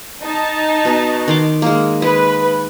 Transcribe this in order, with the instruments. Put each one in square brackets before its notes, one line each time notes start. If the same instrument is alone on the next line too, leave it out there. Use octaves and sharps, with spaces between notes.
[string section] D#4 A5
[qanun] B2
D#3 C6 D6
G#3 A#3
[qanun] G#3 [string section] B4